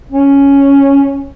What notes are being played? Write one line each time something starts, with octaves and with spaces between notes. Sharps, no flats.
C#4